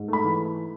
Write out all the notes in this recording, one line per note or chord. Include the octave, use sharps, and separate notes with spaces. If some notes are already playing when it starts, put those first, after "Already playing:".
Already playing: G#2
A3 B5
E3